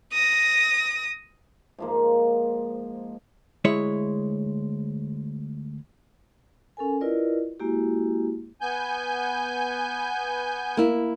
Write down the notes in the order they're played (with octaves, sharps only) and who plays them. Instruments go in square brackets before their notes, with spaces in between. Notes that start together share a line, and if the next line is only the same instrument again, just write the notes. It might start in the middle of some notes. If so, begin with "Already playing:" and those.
[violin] D#6 A#6
[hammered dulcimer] G#2 F3 A#3
[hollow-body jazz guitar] D2 G#3 E4 C#5
[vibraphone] C#4 A4 A#4 G#5
E4 F4 A#4 B4 D5 D#5
G#3 A#3 E4 F#4 G4
[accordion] B3 G#5 G6
[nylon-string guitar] A#3 E4